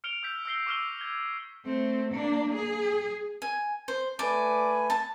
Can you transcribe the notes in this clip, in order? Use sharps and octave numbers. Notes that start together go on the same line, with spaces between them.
F6 C#7 D7 F7 G7
E6 G6 B6
E6 F6 A#6 C7 G7
C#6 D6 E6 F6 B6 G7
G#6 G7
A3 C4
A#3 D4
G#4
G#5
C5
A3 B4 D5 G#5
A5